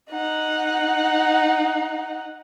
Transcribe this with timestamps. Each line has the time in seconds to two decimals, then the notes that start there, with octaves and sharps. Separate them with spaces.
0.11 D#4 F#5